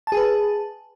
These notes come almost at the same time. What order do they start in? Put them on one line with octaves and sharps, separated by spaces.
A5 G#4 B4